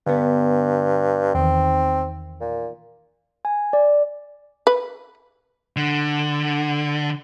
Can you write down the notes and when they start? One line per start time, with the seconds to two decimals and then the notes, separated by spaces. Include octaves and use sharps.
0.06 G2 D3 B3
1.35 E2 D#3 C4
2.41 A#2
3.45 G#5
3.73 D5
4.67 B4
5.76 D3